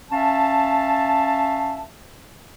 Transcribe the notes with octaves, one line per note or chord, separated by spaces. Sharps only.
C#4 E5 F5 A5